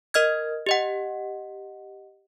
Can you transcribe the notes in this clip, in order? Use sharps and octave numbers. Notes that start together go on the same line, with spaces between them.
A#4 D#5 F6 G#6
G4 D#5 F#5